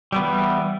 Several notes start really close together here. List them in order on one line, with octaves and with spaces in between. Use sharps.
G3 B3 E3